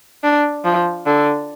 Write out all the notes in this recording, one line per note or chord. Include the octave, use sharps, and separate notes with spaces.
D4
F3
D3